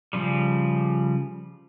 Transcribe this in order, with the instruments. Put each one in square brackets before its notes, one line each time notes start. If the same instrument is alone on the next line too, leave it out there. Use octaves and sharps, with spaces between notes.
[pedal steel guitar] C#3 F3 G3